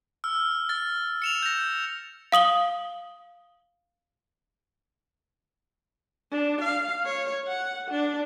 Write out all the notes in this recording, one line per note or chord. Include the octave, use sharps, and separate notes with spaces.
E6 F6
F6 A6
C#7 E7 F7
G6 A#6
F5 D#6 F#7 G7
D4
F5
C#5
F#5
D4